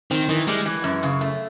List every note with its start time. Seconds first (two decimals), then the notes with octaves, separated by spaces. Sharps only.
0.11 D#3 C4
0.29 D#3 E3
0.47 G3 G#3
0.66 E3
0.84 F#2
1.03 C#3
1.21 A3